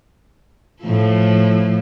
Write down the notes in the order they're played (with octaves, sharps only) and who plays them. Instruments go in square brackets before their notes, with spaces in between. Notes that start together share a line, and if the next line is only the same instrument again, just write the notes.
[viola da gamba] A2 F3 A3